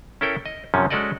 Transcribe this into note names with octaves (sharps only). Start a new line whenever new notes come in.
C#4 E4 A4 A#4 G5
D#5
F#2 C3 F3 C#4
G#3 C#4 F#4 A4 D5 D#5